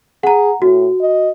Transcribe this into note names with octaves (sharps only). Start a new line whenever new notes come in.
G#4 F#5 A#5
A2 F#4
D#5